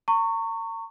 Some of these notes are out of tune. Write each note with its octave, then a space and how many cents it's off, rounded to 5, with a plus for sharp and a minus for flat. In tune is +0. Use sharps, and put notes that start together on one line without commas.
A#5 -40 C#6 +0